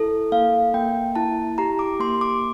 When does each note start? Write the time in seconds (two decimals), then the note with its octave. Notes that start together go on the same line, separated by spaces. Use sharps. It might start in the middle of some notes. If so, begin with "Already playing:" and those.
Already playing: E4 A4
0.32 A#3 F5
0.74 A#3 G5
1.15 E4 A5
1.58 G4 A#5
1.79 D6
2.00 A#3 C6
2.21 D6